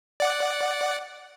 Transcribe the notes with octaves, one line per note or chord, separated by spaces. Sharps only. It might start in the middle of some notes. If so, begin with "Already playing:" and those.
D5 F#5